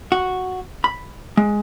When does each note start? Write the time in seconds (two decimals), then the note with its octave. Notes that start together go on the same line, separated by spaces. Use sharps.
0.12 F#4
0.84 B5
1.37 G#3